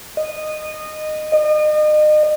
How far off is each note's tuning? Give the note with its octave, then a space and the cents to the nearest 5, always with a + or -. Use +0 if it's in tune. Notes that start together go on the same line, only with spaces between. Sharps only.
D#5 -15
D#5 -35